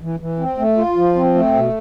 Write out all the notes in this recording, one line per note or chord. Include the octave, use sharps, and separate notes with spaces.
E3
E3
C4
A3
F4
F3
C4
A3
B2